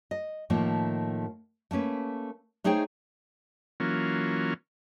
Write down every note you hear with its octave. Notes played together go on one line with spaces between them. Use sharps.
D#5
A2 D#3 F3 A3 A#3
A3 A#3 C#4 B4
A3 D#4 G#4 C5 C#5 G5
E3 F#3 A#3 C#4 F4